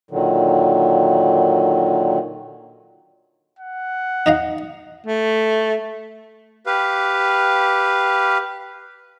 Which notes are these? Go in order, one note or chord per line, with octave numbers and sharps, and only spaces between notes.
A#2 D3 D#3 F#3
F#5
D#4 D#5 F5
A3
G4 B4 F5